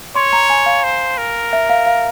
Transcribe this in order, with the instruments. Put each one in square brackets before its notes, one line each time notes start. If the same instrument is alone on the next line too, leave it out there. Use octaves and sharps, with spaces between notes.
[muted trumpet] C#5 [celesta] C6
[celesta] A#5
G#5
F5
[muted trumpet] C5
A#4
[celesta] E5
F5
F5